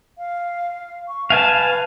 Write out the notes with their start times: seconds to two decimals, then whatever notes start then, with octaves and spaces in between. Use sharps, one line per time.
0.18 F5
1.08 C#6
1.30 B4 F5 G#5 A5